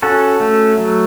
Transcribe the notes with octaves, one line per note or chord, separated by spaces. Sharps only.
C#4 F#4 A4
A3
F#3